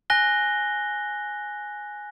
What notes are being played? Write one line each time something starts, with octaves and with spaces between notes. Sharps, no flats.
G#5 F#6 A#6 G7